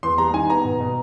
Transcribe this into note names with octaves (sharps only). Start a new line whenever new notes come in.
E2 C6
G3 A#5
D#3 G#5
B3 A#5
B2
B2